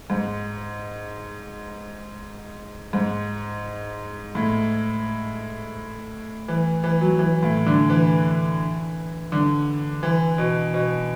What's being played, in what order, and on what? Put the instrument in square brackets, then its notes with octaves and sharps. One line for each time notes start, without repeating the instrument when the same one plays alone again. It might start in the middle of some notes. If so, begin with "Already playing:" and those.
[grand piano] G#2
G#2
A2
E3
E3
F#3
E3
A2
D3
E3
D3
E3
B2
B2